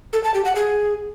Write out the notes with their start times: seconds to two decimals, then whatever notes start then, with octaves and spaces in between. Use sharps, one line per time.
0.13 A4
0.24 A5
0.34 G4
0.45 F#5
0.55 G#4